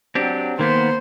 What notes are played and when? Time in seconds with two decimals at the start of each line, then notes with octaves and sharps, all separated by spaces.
0.15 F#3 C4 D4 G4
0.59 D#3 A#3 B3 C5